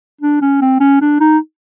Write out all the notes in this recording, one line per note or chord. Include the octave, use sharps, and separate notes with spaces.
D4
C#4
C4
C#4
D4
D#4